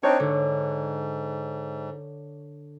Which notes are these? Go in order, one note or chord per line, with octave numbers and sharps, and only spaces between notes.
C4 D4 D#4 C#5
G#2 D3